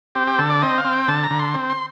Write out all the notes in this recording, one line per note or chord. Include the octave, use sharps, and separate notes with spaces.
C4 G4
G4
D3 A4
D5
C4 D#5
F5
C4
G5
D3 A5
A#5
D3
C6
C4
C6